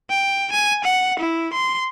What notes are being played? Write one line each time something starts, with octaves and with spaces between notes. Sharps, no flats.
G5
G#5
F#5
E4
C6